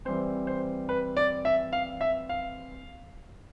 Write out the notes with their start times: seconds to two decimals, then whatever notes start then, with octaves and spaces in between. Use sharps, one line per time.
0.05 E3 G3 C4 C5
0.47 C5
0.89 B4
1.17 D5
1.45 E5
1.73 F5
2.01 E5
2.29 F5